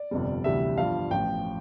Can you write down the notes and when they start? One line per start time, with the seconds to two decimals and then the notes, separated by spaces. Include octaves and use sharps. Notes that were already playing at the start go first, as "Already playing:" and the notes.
Already playing: D5
0.11 G1 F2 C3 G3
0.44 D2 C3 E3 G3 E5
0.78 G1 G2 F3 F5
1.11 A1 A2 F3 G5